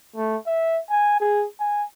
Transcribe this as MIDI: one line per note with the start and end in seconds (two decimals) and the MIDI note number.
0.16 0.36 57
0.46 0.78 76
0.90 1.19 80
1.20 1.45 68
1.60 1.84 80